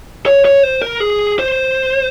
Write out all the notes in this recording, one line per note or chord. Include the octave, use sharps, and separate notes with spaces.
C#5
C#5
C5
A#4
G#4
C5